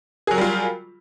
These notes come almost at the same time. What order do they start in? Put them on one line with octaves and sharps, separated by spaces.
G#4 F#3 A#4 G3 F4